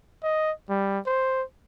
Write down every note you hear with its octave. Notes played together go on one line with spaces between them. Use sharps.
D#5
G3
C5